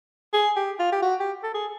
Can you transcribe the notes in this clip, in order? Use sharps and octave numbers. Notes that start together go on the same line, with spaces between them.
G#4
G4
F4
G4
F#4
G4
A4
G#4